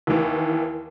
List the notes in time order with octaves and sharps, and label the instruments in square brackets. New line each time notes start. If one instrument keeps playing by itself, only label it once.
[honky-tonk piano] D#2 D#3 E3